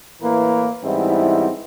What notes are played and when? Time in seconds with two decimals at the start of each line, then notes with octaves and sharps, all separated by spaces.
0.22 A2 E3 A#3 A#4 B4
0.83 G#2 E3 G3 B3 C4 E4